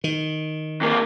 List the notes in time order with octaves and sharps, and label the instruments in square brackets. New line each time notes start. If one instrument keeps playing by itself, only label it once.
[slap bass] D#3
[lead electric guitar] F2 A#3